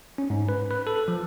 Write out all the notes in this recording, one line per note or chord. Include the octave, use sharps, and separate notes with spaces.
C#4
G#2
B4
B4
A4
F3